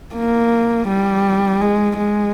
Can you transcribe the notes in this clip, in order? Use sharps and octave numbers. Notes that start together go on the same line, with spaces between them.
A#3
G3
G#3
G#3